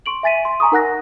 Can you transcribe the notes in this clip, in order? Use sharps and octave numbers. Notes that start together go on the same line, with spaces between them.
C6 C#6 D7 F#7
E5 G#5 A6 B6 D#7
C6
G#5 A#5 C#6 D#6
D#4 A#4 F#5 F#6 A#6